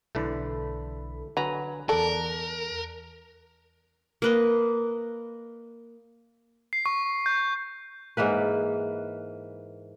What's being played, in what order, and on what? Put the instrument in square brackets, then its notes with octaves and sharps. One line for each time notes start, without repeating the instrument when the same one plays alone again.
[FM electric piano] B1 A4 B5 [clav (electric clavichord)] D3 E3 A3
[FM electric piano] D3 G#5 [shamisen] F#3 [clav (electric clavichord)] B4 A#5
[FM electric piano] E2 F#6 [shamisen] A4 [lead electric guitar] A#4 [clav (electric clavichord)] D5
[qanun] A#3 B4 D#5
[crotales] C7
C#6
G6
[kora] G#2 E3 A#3 B4